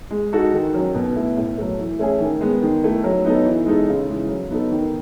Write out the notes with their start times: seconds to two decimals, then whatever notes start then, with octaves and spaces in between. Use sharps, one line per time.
0.10 G#3
0.33 D#4 F#4 A4
0.54 D#3
0.74 F#3 C#4
0.95 B2
1.16 A3 E4
1.36 A2
1.57 F#3 A3
1.79 E3
1.99 A3 C#4 E4 G#4
2.20 D#3
2.41 G#3 B3
2.62 D#3
2.83 A3 E4
3.04 F#3
3.24 B3 D#4 A4
3.45 E3
3.66 G#3 D#4 A4
3.88 C#3
4.08 E3 G#3
4.29 F#3
4.50 B3 D#4 A4
4.72 D#3